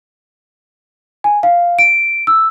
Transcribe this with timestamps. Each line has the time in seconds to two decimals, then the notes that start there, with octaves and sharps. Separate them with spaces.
1.24 G#5
1.43 F5
1.79 D7
2.27 E6